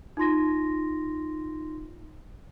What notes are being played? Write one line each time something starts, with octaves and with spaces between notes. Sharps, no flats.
D#4 F4 C6 A#6